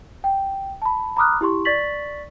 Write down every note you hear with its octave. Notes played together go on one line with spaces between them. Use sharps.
G5
A5 B5
A#5 B5 D6 D#6 F6 F#6
E4 G4 C6 C#6
D5 C#6 A6 B6 F#7